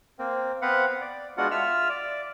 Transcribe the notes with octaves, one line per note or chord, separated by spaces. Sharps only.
A#3 C4
B3 C4 B4 F5 F#5
D5
G#3 B3 D4 F4 F#4 F#5
F4 E5 E6 F6
D5